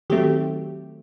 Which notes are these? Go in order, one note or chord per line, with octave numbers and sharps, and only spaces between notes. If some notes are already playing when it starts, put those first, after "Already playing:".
D#3 F#3 A3 C4 G4